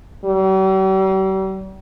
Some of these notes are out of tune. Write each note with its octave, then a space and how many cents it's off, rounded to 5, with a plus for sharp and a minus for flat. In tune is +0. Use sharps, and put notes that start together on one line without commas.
G3 -45